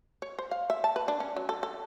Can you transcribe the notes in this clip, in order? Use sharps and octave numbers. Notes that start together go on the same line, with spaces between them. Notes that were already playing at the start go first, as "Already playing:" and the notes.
C#5
C5
F5
E5
A5
B4
D4
C#4
F#3
A4
A4